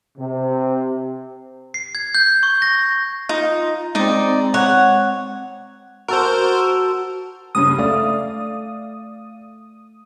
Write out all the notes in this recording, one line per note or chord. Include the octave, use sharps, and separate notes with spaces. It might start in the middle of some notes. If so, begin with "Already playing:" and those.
C3
C7
G#6
G6
C#6
A#6
D#4 F4
G#3 C4 D#4 D5
C#5 F#5
F#4 A4 A#4 C5
F#1 G2 C#3 D#6
A3 D5 F5